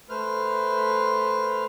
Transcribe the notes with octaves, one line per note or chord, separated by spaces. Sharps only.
A3 B4 C5 F6